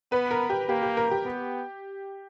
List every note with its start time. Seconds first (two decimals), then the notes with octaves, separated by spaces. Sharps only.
0.12 B3 B4
0.31 A#4
0.50 G4
0.69 A#3 G4
0.83 G4
0.97 A#4
1.11 G4
1.25 B3